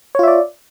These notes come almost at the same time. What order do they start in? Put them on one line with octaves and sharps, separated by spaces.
C#5 F4 E5 D5